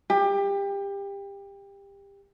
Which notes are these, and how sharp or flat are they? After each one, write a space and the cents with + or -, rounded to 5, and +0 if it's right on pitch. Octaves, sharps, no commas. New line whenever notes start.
G4 +25